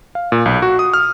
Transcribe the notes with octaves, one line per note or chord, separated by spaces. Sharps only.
F5
A#2
B1
F#4
D#6
F6